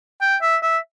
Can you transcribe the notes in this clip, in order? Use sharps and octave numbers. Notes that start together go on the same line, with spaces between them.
G5
E5
E5